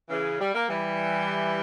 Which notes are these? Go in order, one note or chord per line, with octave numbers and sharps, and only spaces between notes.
C#3 E3
G3
A#3
E3 G3